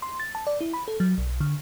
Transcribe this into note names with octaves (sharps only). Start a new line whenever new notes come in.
C6
A6
A5
D5
E4
B5
A4
F#3
B1
D3